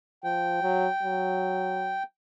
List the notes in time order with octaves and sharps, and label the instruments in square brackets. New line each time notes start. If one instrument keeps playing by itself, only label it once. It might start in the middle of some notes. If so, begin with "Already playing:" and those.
[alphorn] F3 [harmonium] G5
[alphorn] F#3
F#3